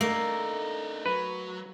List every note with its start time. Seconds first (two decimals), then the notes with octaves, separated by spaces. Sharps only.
0.01 A3 A#3 D4 D#4
1.06 F#3 B4